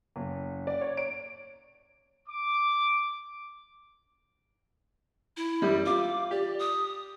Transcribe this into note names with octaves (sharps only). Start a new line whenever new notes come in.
F#1
D5
C#5
D7
D6
E4
F#2 G3
F4 D6
G4 D5
D#6